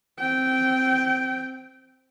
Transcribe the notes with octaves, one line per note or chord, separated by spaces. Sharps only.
C4 G5